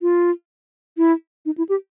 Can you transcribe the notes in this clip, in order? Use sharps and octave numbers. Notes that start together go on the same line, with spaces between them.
F4
E4
D#4
E4
G4